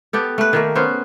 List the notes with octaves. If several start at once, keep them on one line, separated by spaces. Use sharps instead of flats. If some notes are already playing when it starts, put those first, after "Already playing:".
B3 G4 A4
A3 B4
D#3 A3 A#3
B3 C#4 C5